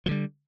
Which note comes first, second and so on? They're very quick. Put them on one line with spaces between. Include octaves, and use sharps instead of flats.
F3 D3 G3